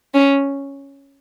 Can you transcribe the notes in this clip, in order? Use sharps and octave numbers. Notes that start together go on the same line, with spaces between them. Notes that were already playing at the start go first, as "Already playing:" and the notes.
C#4